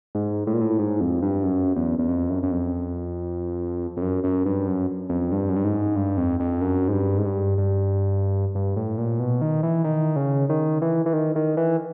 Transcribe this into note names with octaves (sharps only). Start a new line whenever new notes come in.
G#2
A2
A#2
A2
G#2
F2
G2
F#2
E2
E2
F2
F#2
F#2
F2
F2
F#2
F#2
G2
F#2
F2
G2
F#2
G2
G#2
G2
F2
F2
F#2
G#2
G2
G#2
G2
G2
G2
A2
A#2
B2
D#3
E3
D#3
C#3
D#3
E3
E3
D#3
D#3
E3